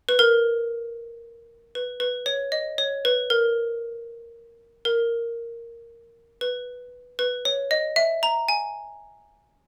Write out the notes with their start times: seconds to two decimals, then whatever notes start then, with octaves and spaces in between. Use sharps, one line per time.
0.09 B4
0.19 A#4
1.75 B4
2.00 B4
2.26 C#5
2.52 D#5
2.78 C#5
3.05 B4
3.30 A#4
4.85 A#4
6.41 B4
7.19 B4
7.45 C#5
7.71 D#5
7.96 E5
8.23 A#5
8.49 G#5